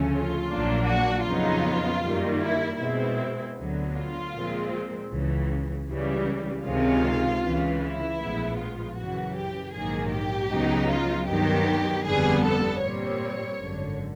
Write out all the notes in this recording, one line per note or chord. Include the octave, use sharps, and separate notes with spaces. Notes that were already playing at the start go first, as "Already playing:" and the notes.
Already playing: D2 C#3 F3 A3 C#4
F4
A#1 A#2 F#3 A#3 D4
F#4
F2 C#3 F#3 B3 D#4 F4
F#2 D#3 G3 A#3
E4
B2 G#3 C4 E4
D2 D3 F#3 B3
F4
A#2 F3 G#3 C4
C#2 C#3 E3
C#2 C#3 E3 G3
C#2 C3 D#3 G#3 C#4 F4
C#2 C#3 E3
E4
A#1 A2 F3 G#3 B3
F4
F#2 C#3 E3 F#4
G4
A#1 G#2 D#3 F#3 A#3 G#4
G4
C#2 C#3 F#3 B3 D#4
F4
G2 D#3 F#3 B3 G4
G1 F2 D3 G3 B3 G#4
A4
A#2 G3 C4 C#5
G#1 F#2 D3